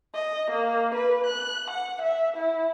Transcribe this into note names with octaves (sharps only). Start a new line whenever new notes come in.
D#5
A#3
B4
F#6
F#5
E5
E4